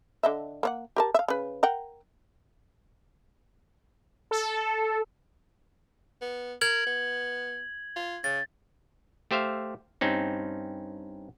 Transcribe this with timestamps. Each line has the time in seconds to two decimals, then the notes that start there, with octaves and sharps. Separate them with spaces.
0.23 D3 D#5 E5
0.63 A#3 C#5 F#5
0.96 G4 A#4 A5
1.14 E5 F5
1.28 C#3 B4
1.63 A#4 F#5 G5
4.31 A4
6.21 B3
6.61 A#4 G#6 F#7
6.86 B3
7.96 F4
8.24 C#3 A6
9.31 A3 G4 C5 E5 F5
10.01 G2 C4 C#4 D#4